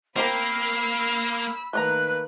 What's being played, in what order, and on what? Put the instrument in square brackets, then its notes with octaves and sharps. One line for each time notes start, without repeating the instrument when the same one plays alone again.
[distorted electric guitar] A#3 [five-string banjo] C4 G4 A#4 [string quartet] B5 E6 [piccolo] C7
[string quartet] D#3 A#3 B4 [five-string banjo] A3 D5 A#5 [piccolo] F#6